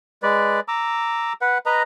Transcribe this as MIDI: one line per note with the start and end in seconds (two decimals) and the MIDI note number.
0.23 0.60 56
0.23 0.60 71
0.23 0.60 74
0.68 1.33 82
0.68 1.33 86
0.68 1.33 88
1.41 1.58 71
1.41 1.58 78
1.66 1.83 71
1.66 1.83 75
1.66 1.83 82